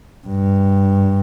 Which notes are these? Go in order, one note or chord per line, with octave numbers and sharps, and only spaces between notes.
G2